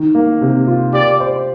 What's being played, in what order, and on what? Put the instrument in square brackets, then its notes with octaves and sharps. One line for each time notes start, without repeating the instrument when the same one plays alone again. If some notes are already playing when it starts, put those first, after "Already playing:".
Already playing: [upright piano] D#3 D#4
A#3
C3
F4
[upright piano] G4 [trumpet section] D5
[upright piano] C5